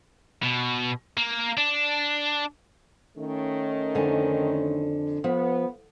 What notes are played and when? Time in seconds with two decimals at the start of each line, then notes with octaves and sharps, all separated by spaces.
0.43 B2
1.18 A#3
1.57 D4
3.17 D#3 A3 C#4
3.95 F2 D3 G#5
5.24 F3 B3